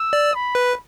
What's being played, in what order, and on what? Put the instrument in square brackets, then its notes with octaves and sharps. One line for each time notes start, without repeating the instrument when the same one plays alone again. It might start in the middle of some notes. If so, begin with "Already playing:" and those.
Already playing: [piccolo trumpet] E6
[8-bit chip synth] D5
[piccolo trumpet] B5
[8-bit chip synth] B4